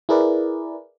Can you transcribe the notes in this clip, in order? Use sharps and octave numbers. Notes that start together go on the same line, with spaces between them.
E4 G#4 A#4 B4 D5